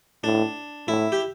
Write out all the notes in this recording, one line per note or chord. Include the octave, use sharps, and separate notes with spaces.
A2 D4
A2 E4
G4